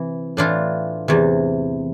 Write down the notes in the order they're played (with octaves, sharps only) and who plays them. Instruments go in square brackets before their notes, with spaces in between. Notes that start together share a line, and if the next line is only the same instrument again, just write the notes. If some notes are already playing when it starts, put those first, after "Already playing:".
Already playing: [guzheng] C3 E3
A2 E3 D4 F4
E2 C3 E3